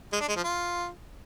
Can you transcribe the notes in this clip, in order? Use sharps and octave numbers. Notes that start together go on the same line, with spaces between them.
G#3
D4
G#3
F3
F4